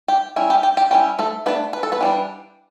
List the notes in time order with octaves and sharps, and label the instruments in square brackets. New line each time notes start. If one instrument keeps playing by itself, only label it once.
[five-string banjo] G4
G3 C#4 E4
G4
G4
G4
G3 C#4 E4 G4
A3 A4
A3 B3 D4 B4
B4
A4
B3 B4
E3 G3 D4